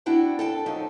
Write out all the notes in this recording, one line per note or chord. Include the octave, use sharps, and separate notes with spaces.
C4 D4 E4 F#4 G5 A5
A4 G5 A5
F#2 F3 F#3 D#4